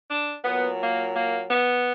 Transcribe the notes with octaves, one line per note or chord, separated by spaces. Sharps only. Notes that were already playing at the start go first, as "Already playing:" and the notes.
D4
A#2 F#3 B3
A#3
A#3
B3